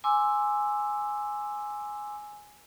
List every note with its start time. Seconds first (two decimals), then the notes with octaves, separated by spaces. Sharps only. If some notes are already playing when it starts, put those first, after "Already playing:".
0.04 G#5 C6 D6 E6